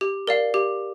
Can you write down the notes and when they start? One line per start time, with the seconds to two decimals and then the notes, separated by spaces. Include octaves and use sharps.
0.01 G4
0.27 A#4 D5 F5
0.54 G4